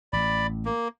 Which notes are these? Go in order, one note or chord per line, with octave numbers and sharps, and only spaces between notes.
A1 D5 B5
A#3